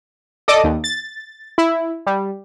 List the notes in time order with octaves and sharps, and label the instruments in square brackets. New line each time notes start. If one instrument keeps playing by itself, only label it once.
[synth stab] A4 D5 D#5 D6 D#6
D#2
A6
E4
G3